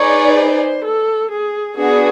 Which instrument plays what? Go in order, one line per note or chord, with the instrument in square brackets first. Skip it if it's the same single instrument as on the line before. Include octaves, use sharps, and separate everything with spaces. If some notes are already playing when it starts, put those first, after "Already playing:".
Already playing: [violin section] D#4 G#4 B4 D5 [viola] C#5
[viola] C5
A4
G#4
[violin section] B3 D4 F#4 [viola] G#4